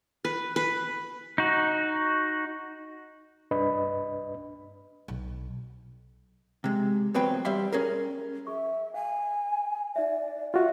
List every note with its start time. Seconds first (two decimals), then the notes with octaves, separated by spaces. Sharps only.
0.25 B4
0.56 B4
1.38 D#4 F#4
3.51 C2 G2 D4 B4 D#5 B5
5.08 B1
6.64 C3 G#3
7.14 E2 F#3 C4 B4 G5
7.45 G3 D5 E5 C6
7.72 C#4 G#4 A#4
8.47 G#4 E5 C#6
8.94 F5 G#5
9.96 D#4 D5 E5
10.54 F4 F#4 E5